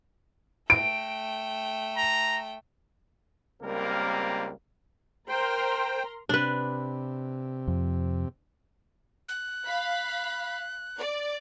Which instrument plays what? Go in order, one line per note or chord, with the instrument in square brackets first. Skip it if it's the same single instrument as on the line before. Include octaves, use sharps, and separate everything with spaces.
[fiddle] A3 G5 [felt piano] D7
[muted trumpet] A#5
[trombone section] C#2 G3 A#3 C4 A#4
[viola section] A#4 A#5 C6 [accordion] C5 G5
[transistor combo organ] C3 [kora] D4 B4
[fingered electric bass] F2
[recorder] F#6
[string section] F5 B5
D5